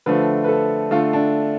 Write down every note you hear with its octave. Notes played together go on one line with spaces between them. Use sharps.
D3 F3 A3 B4
B4
A4
D3 A3 F4
D4